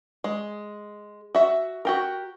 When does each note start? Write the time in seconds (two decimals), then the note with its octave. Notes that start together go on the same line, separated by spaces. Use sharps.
0.24 G#3
1.35 F#4 E5
1.85 F#4 G4 A#4